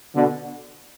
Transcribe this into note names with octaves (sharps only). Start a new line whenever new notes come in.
B2 D3